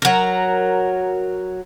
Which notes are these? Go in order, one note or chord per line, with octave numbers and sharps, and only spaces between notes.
F#3 A#4